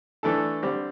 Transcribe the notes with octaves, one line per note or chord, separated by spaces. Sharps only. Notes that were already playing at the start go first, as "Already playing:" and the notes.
E3 A3 D4 A4
D3 G3 C4